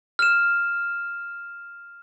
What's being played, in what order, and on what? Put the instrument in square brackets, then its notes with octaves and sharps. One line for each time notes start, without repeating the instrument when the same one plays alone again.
[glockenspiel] F6 E7